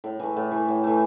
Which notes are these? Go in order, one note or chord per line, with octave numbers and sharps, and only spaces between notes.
A2
E3 A3
A2
E3 A3
A2
E3 A3